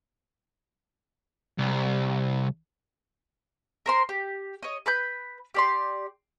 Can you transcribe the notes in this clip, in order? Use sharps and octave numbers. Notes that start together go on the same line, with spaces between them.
C2
A#4 C5 C6
G4
C#5 D#5
B4 B5 G6
G4 D5 C6